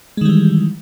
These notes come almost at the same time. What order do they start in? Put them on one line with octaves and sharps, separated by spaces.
G#3 D#3 G3 E3